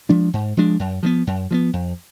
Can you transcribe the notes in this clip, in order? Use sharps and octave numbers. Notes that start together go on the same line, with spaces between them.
F3 G#3 D4
G#2
F3 G#3 D4
F#2
F3 G#3 B3
F#2
F3 G#3 B3
F2